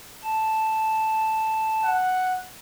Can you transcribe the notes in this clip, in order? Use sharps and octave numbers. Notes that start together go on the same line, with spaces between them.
A5
F#5